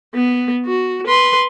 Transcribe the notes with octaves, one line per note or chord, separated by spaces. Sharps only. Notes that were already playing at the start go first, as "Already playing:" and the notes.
B3
F#4
B4 C6